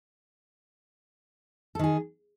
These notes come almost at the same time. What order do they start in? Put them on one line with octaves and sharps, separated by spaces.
A4 D#3 G#4